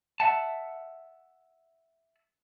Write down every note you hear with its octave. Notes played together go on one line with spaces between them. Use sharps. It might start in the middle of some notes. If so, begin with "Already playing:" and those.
E5 F#5 A5